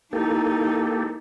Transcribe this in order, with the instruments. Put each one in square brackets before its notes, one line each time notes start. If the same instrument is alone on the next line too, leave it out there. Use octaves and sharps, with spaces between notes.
[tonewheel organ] A#3 G4 A4 [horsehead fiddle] D#4 E4